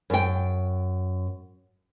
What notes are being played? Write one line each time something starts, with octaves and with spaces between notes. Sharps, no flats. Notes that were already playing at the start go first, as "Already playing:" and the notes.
F#2 G5